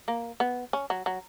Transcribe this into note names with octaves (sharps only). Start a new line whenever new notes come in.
A#3
B3
C#4
F#3
F#3